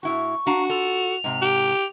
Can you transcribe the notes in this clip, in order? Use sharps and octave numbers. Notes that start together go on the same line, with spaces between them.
A2 E4 F#4 C#6
D4 F#4 F5 A#5
F4 A4 F7
G#2 C3
G4